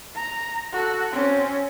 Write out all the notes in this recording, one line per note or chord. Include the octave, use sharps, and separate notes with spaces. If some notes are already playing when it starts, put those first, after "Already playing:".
A#5
F#4 A4
C4 C#4